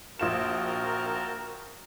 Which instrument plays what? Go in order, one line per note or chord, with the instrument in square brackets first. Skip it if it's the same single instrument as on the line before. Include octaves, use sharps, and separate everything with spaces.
[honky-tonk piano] A#1 F4 E7 [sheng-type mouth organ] F#4 G5 A5 [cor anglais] A#4